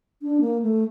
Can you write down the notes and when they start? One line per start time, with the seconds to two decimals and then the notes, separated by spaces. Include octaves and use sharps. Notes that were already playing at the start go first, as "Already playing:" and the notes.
0.22 D4
0.41 A#3
0.62 A3